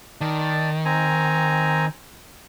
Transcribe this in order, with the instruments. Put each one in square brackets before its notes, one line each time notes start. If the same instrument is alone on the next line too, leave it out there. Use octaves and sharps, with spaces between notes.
[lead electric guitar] D#3 [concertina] D5 A5
[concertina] C4 G#5 A#5